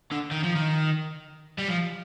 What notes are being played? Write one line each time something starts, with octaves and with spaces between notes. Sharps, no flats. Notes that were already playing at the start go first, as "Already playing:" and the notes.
D3
D#3
F3
D#3
G3
F3